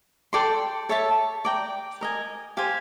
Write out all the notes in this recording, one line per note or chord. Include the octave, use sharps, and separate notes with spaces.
A4 D5 G5 C6
A4 C#5 E5 A5
D5 G5 A#5
A#4 D#5 G#5
G4 C5 F5 G#5